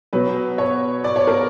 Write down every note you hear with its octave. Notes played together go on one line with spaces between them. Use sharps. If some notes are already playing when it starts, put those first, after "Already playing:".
B2 F#3 B4
C#5
D5
C#5
A#4